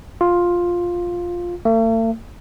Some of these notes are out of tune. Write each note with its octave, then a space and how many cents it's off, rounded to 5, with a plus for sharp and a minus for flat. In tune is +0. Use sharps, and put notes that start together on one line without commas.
F4 +5
A3 +45